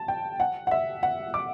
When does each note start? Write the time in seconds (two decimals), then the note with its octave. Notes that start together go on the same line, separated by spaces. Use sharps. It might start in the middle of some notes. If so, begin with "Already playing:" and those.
Already playing: A5
0.08 G5
0.40 F#5
0.67 F#5
0.71 E5
1.03 F#5
1.34 D6